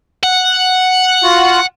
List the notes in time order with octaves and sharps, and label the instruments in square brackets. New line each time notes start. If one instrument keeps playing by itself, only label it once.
[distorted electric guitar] F#5
[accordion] F4 F#4